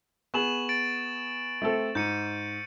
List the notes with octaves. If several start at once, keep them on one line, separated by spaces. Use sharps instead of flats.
B3 G#4 C#6 E7 F#7
A6 D7
A3 C4 A4
G#2 G6 C#7 D#7